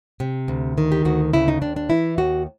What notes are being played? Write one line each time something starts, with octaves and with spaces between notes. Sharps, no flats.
C3
D2
D#3
G4
D2 F#4
C#3 E4
D#4
D#2 D4
D4
E3 E4
D#2 F#4